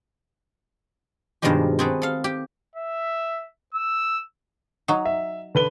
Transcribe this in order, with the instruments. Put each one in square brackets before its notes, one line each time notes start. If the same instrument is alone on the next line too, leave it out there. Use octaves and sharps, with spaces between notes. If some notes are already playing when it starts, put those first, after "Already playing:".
[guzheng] G2 B2 D#3 F3 G#3 G4
C4 F#4 G#4 A4 B4
A4 F5
G4
[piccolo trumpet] E5
E6
[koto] F#3 D#4
[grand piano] E5
D3 B4 G7